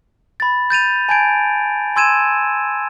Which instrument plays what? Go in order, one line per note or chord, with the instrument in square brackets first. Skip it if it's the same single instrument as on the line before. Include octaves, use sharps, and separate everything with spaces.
[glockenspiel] B5 A6
G6 A6 D#7 F7
G#5 A5 G6 G#6 D7
G#5 C6 E6 G#6 D#7 E7